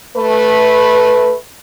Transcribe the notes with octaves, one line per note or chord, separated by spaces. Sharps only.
A3 B4